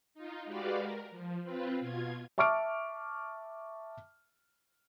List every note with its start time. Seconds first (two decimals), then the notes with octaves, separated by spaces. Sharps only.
0.14 D#4 F4
0.45 G#3 F#4 G4 B4 D5 F5
0.80 A#4
1.11 F3
1.43 C4 F4 B4
1.80 B2 F4 G#6
2.38 E5 A5 C#6 D6 F6 D7